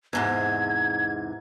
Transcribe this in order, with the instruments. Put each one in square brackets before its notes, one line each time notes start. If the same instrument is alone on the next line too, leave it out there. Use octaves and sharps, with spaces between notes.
[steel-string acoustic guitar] E2 G#2 C3 [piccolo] G#6